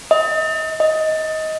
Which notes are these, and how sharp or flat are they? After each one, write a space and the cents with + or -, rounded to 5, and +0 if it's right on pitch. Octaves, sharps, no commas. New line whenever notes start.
D#5 +35
D#5 +20